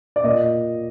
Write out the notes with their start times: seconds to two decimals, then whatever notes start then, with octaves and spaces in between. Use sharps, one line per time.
0.16 D5
0.24 A#2 D#5